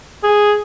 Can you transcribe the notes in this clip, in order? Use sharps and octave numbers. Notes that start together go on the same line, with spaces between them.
G#4